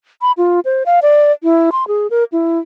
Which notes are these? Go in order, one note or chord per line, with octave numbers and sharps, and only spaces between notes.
B5
F4
C5
F5
D5
E4
C6
G#4
A#4
E4